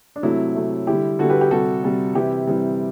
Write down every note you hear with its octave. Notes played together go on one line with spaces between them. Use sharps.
D4
C3 F#3 A3 E4
C3 F#3 A3
D3 G3 E4 G4
D3 G3 F#4 A4
G4 B4
G4
C3 G3 F#4 A4
C3 G3
C3 E3 G3 E4 G4
C3 E3 G3